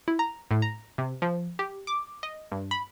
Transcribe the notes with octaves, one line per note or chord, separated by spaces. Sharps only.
E4
A#5
A2
A#5
C3
F3
G4
D6
D#5
G2
B5